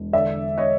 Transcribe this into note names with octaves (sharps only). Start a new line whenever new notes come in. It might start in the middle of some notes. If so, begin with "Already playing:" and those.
Already playing: E1
D3 D5 E5
C#5 D#5